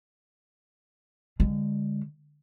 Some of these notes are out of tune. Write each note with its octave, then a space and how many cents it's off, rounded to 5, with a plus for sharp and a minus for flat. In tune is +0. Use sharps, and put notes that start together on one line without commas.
D3 -10 G#3 -30